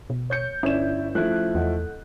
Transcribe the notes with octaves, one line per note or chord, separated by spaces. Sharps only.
B2
C#5 G6 C#7
G1 C#4 E4 C#5 D5 E7
F3 A3 E4 F#6
E2 A4 D#5 F#5